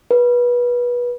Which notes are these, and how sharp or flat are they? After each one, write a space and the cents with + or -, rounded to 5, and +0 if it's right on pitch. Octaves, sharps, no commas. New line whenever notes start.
B4 -25